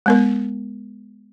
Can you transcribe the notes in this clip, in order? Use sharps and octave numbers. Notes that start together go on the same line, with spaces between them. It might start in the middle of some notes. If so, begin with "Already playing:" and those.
G#3 B3 A#4